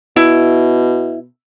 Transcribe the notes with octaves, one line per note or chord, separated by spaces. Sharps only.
B2 E4